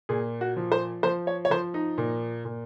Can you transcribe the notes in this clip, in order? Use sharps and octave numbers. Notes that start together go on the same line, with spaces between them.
A#2 G#4
F#4
F3
C5
F3 C5
C#5
C#5
F3 C5
D#4
A#2
A#2